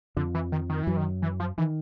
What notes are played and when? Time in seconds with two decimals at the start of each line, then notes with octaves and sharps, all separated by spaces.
0.17 F2 D3 F3
0.34 E3
0.52 D#3
0.69 D#3
0.83 F#2 E3 F#3
0.97 D#3
1.22 E3
1.40 F3
1.58 D#3 E3